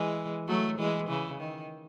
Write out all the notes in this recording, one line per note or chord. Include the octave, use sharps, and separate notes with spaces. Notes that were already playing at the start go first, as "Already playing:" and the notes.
Already playing: E3 G#3
F#3 A3
E3 G#3
C#3 E3
D#3